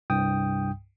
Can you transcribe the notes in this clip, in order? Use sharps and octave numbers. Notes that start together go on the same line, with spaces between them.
C2 G2 G5 D#6